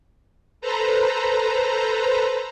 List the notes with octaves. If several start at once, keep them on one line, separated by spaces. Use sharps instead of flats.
A4 B4 C5 A#5